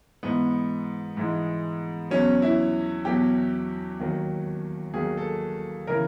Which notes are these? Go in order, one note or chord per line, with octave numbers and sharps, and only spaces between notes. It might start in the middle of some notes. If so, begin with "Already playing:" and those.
G#2 E3 G#3 B3
G#2 E3 G#3
E2 B2 F#3 C#4
E4
E2 B2 F#3 G4
D#2 D#3 F#3
D#2 D#3 F#3 G#4
A4
C#3 E3 A#4